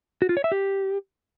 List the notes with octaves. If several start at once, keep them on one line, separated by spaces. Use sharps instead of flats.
F#4
F4
C#5
E5
G4